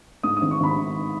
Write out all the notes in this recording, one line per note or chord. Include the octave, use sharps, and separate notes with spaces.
G#2 D#6
D#6
G#1
C#6
G#1 B5
D#3